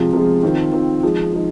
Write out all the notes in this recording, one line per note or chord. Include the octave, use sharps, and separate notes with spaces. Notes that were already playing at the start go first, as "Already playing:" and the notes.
Already playing: C3 F3 G#3 F4
C3 F3 G#3 F4
D#3 C4 F4
D#3 C4 F4
F3 G#3 D#4
F3 G#3 D#4